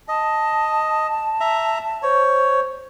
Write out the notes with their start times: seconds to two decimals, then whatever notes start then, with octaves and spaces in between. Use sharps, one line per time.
0.08 D#5 A5
1.40 E5 A#5
2.03 C5 C#5